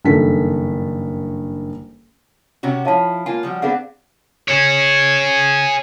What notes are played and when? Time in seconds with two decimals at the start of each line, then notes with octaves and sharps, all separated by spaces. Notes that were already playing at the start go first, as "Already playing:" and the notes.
0.05 F#1 G2 D#3 A4 B6
2.63 C3 C#4 F#4
2.85 F3 E4 C#5 F5 A5
3.26 A#3 F4 G#5
3.43 F3 G3 F#4
3.62 B3 C4 D4 G#4 F5 F#5
4.48 G#4 C#5